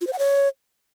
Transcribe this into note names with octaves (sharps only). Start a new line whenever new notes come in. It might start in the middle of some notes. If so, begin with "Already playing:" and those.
F4
C5
F#5
C#5